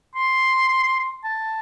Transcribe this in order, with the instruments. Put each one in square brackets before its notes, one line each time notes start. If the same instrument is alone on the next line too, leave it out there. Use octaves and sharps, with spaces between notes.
[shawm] C6
A5